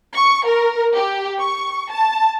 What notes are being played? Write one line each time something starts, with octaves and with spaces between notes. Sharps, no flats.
C#6
A#4
G4
C#6
A5